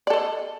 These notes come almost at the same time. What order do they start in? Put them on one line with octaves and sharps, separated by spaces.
D5 A4 D#5